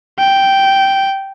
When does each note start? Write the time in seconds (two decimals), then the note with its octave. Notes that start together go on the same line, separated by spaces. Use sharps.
0.18 G5